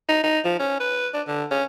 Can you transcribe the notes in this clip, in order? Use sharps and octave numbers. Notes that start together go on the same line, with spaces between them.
D#4
D#4
F3
C#4
B4
D4
D3
C#4